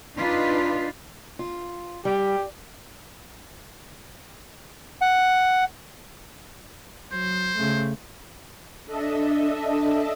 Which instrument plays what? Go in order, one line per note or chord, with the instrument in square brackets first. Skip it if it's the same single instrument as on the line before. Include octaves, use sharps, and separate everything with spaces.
[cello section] D4 D#4 F4 B4
[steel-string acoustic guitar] F4
[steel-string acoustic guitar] G3 [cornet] G4
[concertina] F#5
[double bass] F#3 [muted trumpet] C5
[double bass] C#3 A3
[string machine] D4 A4 D#5 E5